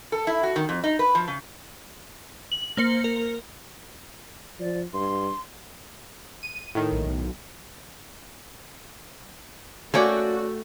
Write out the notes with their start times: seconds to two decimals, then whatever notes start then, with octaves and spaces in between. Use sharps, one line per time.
0.12 A4
0.27 E4
0.43 F#4
0.56 D#3
0.69 F2
0.84 D#4
0.99 B4
1.15 F3
1.28 C#3
2.52 F#7
2.77 A#3 C5 C#7
3.04 A#4
4.60 F3 D5
4.94 G2 C6
6.43 D#7
6.75 A2 D#3
6.92 A#1
7.06 B1
9.94 A3 A#3 C#4 F#4 D5 G5